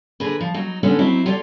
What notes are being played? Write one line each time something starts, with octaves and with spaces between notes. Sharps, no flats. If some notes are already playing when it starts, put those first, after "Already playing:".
D3 G#4 A#4 B4
F3
F#3 D#4
D3 G#3 B3 C#4 D#4 A4
F#3 C4 D#4 E4
F4 G4 A4 C#5 D5